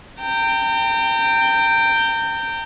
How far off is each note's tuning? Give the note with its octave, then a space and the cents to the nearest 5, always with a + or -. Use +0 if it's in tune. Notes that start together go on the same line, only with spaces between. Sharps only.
G5 +0 A#5 -40